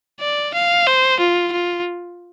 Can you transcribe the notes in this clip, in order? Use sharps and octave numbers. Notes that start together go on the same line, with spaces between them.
D5
F5
C5
F4
F4